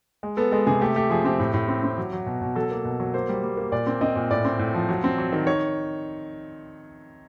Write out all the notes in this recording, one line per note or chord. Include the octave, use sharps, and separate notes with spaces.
G#3
B3 A4
G#3 A4
C3 G#4
A3 G4
A3 G4
F3 G#4
C4 G4
A2
A2
C4
C4
F#3
F#3
B2
B2
F#3 A4
A#3
B2
F#3
A#3 C5
G3
G3
A#3
A#2 D5
C4
C4 D#5
A#2
A2 D5
C4
A2
F3
F#3
C4
F#3
D#3
D#3 C#5